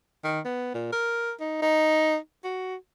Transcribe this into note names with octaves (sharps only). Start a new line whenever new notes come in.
D#3
B3
A#2
A#4
D#4
D#4
F#4